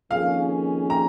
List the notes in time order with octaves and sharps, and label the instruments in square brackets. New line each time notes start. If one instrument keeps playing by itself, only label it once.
[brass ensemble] F2 D#3 A#3 C#4 G#4 [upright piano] F5
[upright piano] A#5